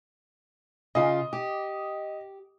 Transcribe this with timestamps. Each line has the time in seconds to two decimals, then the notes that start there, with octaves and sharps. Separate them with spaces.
0.95 C#3 F4 D#5
1.33 G4